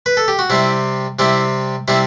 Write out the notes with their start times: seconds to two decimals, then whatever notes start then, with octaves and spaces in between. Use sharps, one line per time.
0.06 B4
0.17 A4
0.28 G4
0.39 F#4
0.50 C3 G3 C4 E4
1.19 C3 G3 C4 E4
1.88 C3 G3 C4 E4